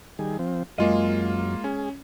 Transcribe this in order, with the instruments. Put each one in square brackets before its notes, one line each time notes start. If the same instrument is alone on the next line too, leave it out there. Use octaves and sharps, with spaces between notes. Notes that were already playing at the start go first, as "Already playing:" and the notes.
[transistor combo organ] D#3 G3 G#4
F3 C4
[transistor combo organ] F#2 [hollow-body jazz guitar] G#3 D#5 [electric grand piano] A#3 F4 F5
[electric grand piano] C#4 [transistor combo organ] G#4